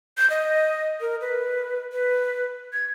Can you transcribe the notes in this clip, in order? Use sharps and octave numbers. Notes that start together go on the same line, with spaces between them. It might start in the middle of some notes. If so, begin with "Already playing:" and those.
G6
D#5
A#4
B4
B4
G#6